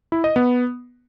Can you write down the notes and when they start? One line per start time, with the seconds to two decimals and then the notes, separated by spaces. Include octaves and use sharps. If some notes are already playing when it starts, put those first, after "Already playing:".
0.12 E4
0.24 D#5
0.36 B3